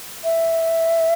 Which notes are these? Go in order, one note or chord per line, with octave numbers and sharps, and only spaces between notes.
E5